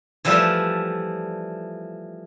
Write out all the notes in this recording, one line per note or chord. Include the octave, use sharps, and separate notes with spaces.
E3 F3 G3 A3 E5